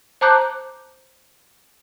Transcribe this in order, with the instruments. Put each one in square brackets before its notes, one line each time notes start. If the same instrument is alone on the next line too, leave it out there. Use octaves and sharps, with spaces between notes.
[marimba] C5 A5 A#5 D6 F#6 G6